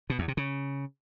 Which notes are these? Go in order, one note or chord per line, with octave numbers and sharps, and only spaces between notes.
B2
E2
C3
C#3